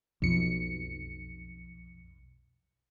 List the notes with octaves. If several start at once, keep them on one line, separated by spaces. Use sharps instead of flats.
B1 F2 C#7